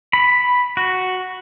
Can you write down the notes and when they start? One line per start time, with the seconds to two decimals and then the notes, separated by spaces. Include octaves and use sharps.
0.13 B5
0.77 F#4